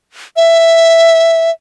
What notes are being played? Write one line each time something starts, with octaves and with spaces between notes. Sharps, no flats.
E5